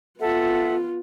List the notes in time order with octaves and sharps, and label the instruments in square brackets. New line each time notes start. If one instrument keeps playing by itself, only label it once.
[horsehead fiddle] B3 F4 [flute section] A4 E5 F#5